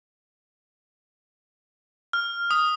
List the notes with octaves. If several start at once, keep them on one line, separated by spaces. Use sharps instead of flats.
F6
D#6